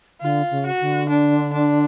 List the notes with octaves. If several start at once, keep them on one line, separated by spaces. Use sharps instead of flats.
D3 F4
C#3
F#4
D3
D4
D4